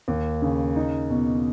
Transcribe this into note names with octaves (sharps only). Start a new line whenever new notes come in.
D#2
C#3
D#4
B2